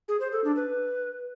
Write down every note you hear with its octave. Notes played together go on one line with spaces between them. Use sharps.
G#4
C5
A4
D4
B4